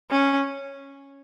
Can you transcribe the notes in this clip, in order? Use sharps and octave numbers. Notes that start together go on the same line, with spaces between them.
C#4